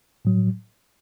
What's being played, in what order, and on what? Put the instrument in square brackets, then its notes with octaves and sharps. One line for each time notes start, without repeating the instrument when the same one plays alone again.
[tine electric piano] A2 F#3